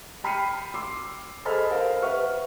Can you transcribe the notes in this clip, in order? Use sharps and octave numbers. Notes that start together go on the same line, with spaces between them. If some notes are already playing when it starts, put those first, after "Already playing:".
G5 B5 F6 C7 C#7 D#7
C6 D6 E6 C7
G#4 A4 C5 D#5 B5 F6
A#4 C5 F5
B4 E5 F#5 C#6 F6